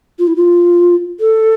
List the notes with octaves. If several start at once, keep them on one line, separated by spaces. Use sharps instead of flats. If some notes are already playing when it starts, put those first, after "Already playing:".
F4
E4
F4
A4